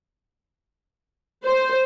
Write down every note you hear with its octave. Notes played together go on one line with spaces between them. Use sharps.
C5